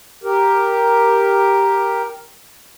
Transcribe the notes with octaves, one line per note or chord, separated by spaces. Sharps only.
G4 A#4